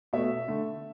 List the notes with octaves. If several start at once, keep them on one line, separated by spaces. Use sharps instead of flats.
B2 A3 E5
D3 A3